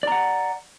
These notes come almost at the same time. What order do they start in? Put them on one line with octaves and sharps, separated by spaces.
D5 A#5 F#5